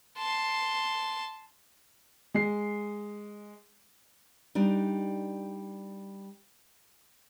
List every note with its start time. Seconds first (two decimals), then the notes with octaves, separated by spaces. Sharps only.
0.18 A5 C6
2.35 G#3 C7
4.55 G3 D4 D#4